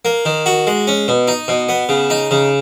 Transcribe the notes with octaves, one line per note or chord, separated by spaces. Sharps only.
A#3
D#3
F#4
G#3
C#4
B2
D#4
B2
B3
C#3
D#4
C#3